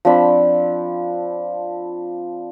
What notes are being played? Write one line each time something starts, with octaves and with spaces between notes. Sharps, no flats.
F3 C4 D4 B5